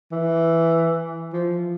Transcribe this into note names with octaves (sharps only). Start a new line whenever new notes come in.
E3
F3